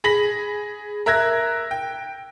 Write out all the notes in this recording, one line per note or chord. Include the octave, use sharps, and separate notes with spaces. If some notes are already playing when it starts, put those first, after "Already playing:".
G#4 B5 A#6 B6 F#7
A#4 E5 E6 F#6 G#6 A#6
G5